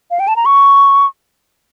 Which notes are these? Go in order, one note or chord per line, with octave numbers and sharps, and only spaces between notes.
F5
G5
A5
A#5
C#6